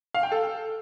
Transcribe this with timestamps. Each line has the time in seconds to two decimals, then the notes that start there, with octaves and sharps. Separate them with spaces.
0.14 F5
0.23 G5
0.32 A4